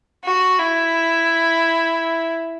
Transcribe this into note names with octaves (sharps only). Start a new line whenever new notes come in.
F#4
E4